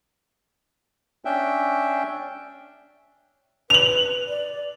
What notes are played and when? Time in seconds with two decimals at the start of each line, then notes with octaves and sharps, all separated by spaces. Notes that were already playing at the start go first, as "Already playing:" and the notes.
1.25 C#4 D4 E5 G5
3.70 B4 F7 F#7
4.29 D5